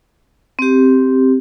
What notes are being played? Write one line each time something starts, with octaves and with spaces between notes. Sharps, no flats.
C4 G4